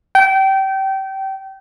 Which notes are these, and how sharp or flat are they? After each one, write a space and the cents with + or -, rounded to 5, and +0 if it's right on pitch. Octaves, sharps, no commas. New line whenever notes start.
G5 -25